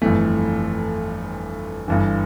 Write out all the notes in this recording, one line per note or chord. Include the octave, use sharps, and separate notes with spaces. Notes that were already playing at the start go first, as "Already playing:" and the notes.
G1 F2 E3 A3
G1 G2 E3